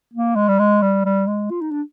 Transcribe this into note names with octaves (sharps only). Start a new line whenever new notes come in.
A#3
G#3
G3
G#3
G3
G3
G#3
F4
D#4
D4